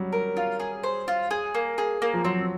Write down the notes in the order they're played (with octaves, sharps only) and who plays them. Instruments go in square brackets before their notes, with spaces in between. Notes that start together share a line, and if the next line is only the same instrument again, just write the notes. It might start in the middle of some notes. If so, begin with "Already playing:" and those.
Already playing: [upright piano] F#3 G3
[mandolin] A#4
F4
G#4
C5
F4
G#4
A#3
G#4
A#3
[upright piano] F3
[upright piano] F#3 [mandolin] C4